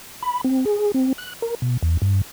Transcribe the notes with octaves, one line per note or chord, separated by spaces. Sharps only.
B5
C4
G#4
C4
F#6
A#4
B2
E2
G2